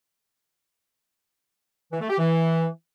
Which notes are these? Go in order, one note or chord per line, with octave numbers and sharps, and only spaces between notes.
E3
A3
G4
E3